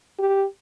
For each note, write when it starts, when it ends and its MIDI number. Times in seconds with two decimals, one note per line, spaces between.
0.19 0.45 67